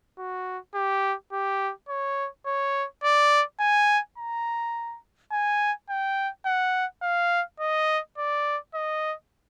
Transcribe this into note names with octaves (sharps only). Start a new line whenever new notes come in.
F#4
G4
G4
C#5
C#5
D5
G#5
A#5
G#5
G5
F#5
F5
D#5
D5
D#5